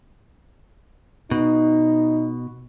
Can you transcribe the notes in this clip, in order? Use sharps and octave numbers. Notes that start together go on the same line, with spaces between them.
B2 D#4